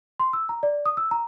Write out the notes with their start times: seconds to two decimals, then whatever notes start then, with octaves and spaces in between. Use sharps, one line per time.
0.20 C6
0.33 E6
0.49 A#5
0.63 D5
0.86 D#6
0.97 E6
1.11 A#5